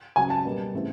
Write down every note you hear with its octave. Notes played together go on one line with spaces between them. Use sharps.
C#2 C#3 F#3 G#5
A5
B2 G3 A#3
C#3 E3 A3 C4